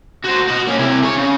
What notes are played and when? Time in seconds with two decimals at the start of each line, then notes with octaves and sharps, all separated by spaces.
0.24 F#4 C5
0.48 F#4 D#5
0.67 A#3 C#4
0.79 C3 E4
1.03 G#4 C#5
1.18 C#3